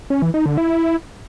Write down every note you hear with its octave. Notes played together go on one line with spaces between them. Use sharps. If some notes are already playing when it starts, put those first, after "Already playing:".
C#4
E3
D#4
D3
E4